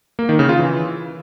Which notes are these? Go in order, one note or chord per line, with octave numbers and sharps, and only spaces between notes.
A#3
D#3
C#3
F4
E3